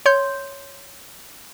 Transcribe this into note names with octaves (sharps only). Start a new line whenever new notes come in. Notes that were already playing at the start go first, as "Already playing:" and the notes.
C#5 C6 G6